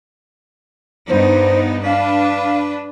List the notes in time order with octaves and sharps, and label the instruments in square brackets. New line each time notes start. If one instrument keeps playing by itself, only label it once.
[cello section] G2 B3 D#4 [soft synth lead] C5
[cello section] D4 B4 [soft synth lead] F5